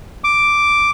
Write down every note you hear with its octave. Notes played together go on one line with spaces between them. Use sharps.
D6